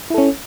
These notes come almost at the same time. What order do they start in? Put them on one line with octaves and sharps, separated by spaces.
E4 A4 C#4